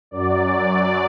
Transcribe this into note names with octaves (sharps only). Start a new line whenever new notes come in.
F#2 F#3 D5